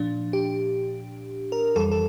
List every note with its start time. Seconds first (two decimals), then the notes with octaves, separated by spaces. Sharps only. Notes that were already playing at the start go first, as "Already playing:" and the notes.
Already playing: A#2 F3 D4
0.33 G4
1.52 A#4
1.75 F2 E3 G3 A4
1.91 A4